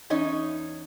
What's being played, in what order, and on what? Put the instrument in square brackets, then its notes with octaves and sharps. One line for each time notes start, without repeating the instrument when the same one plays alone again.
[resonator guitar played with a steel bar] E2 C#4 D#4 C#5